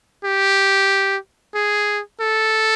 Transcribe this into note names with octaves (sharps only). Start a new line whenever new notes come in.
G4
G#4
A4